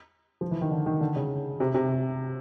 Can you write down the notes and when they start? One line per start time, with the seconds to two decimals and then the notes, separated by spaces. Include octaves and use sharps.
0.41 F3
0.51 E3
0.61 D#3
0.71 D3
0.86 D#3
1.01 D3
1.16 C#3
1.60 C3
1.74 C3